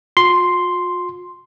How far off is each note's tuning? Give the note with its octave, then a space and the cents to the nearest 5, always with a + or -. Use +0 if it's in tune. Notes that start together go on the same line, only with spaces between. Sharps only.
F4 +45 C6 +0